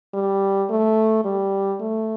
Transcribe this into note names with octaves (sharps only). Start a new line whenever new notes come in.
G3
A3
G3
A3